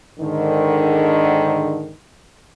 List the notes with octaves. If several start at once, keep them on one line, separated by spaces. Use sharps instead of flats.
G#2 D3 D#3